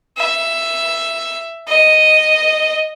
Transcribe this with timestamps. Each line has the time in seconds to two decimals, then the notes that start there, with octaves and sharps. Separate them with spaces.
0.17 E5
1.68 D#5